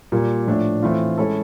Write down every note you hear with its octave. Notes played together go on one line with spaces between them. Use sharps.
A#2 G3 A#3
A2 F3 A3 D4
A2 E3 A3 C4 F4
G#3 C#4 E4 A4